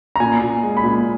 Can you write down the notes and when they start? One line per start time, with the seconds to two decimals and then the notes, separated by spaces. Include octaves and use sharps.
0.16 A#5
0.20 A#2 G#5
0.41 A#2
0.63 G#3
0.77 B5
0.83 A#2